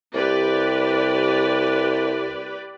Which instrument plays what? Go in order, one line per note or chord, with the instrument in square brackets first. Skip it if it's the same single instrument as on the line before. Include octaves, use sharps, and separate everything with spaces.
[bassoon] C2 [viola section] G4 B4 D5